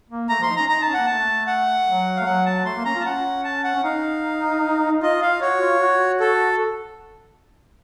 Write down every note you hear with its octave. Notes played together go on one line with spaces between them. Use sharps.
A#3
A3 A#5
F3 C6
D#4
C#4 A#5
D#4 A#5
D#4 A5
C#4
A#3 F#5
A3 A5
F#5
F#3
F5
A3
F#3 F#5
A5
A3 C6
A#3
C#4 A#5
F4
A5
C#4 F#5
A5
F#5
C#4
D#4 F5
D#4
F4 D#5
F4 F5
F#4 C#5
F4
F#4
A4